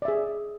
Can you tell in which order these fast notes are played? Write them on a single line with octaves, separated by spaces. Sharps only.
D5 E5 G#4